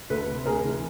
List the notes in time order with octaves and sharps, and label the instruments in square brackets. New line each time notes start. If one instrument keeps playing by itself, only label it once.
[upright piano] D2 A4 B4
C3
D2 G#4 A#4
E3